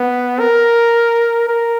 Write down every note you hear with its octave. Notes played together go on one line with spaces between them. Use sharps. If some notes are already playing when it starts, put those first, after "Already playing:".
Already playing: B3
A#4
A#4